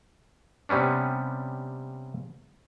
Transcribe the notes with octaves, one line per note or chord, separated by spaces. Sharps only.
C3 G3 B3 C#4 D4